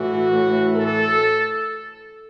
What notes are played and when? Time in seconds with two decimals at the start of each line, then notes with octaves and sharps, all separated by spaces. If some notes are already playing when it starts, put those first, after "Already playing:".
Already playing: A2 E3 F#4
0.30 A2 E3
0.72 A4